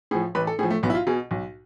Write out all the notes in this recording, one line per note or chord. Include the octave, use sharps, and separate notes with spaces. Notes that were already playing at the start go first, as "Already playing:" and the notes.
A2 F3 G#4
A1 B4
A4
A2 F3 G#4
A3
B1 B3
E4
F4
B2 G#4
B1